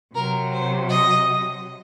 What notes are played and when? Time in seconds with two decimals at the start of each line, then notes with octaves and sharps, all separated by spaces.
0.14 C3 F#3 A#4
0.53 C5
0.90 D#5